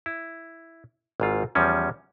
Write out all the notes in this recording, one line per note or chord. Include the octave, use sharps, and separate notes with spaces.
E4
G#1 G#2 F4
E2 F3 G3 C#4